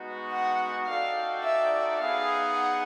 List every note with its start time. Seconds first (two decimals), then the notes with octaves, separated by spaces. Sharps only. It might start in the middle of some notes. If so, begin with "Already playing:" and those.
Already playing: G#3 B3 D#4 F#4
0.32 F#5
0.87 D#4 F#4 A4 D5 F5 G5
1.43 E5
1.98 B3 D#4 G#4 F5
2.53 F#5